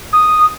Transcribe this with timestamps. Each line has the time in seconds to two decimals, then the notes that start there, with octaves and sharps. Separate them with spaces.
0.13 D#6